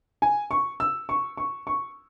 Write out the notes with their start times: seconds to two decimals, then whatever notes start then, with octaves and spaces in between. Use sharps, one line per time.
0.22 G#5
0.51 C#6
0.80 E6
1.09 C#6
1.37 C#6
1.67 C#6